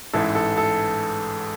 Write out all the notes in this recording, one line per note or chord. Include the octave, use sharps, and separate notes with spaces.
A1 G#2 E3 A4
A4
A4